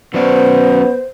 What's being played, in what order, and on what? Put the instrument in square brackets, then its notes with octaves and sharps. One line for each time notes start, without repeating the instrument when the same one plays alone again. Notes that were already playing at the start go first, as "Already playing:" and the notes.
[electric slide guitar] F#3 C#4 D5 [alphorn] B3 [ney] C5